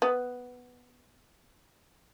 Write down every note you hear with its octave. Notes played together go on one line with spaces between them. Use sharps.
B3